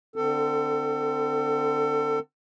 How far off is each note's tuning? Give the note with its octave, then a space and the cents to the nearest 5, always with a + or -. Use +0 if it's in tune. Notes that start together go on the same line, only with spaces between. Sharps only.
D3 +0 C4 -25 A4 +30